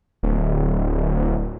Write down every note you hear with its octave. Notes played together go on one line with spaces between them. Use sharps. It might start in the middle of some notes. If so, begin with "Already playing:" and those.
D1